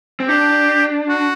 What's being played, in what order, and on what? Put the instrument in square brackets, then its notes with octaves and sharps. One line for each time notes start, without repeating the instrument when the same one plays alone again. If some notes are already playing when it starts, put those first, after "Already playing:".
[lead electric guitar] C4
[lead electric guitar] D4 [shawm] G4
[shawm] F#4